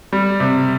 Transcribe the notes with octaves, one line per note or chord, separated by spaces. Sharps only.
G3
C3